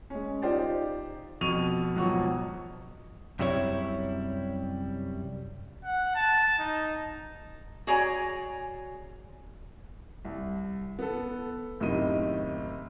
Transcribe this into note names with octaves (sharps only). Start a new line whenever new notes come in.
G#3 C#4
D#4 F4 G4 C5 D5
F2 B2 C#6 D#7 F7
G#1 B2 F3 F#3 F#5 C#6
F#2 C3 G3 E4 C#5
F#5
A5
D#4
F#4 G#4 C#5 D5 G#5 A#5
C2
B3 A4
F#1 A2 C3 D#3 D#4 D#7